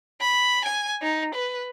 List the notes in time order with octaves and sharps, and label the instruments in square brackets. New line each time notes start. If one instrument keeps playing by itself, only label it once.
[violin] B5
G#5
D#4
B4